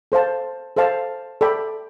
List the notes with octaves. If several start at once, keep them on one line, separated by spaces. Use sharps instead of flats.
A4 C5 F5 A5
A4 C5 F5 A5
A4 D5 G5 B5